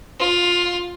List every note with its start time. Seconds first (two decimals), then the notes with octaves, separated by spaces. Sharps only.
0.20 F4